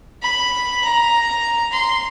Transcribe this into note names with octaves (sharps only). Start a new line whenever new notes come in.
B5
A#5
C6